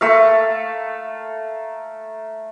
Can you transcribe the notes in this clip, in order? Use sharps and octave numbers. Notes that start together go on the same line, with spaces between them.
A3 A#4 F5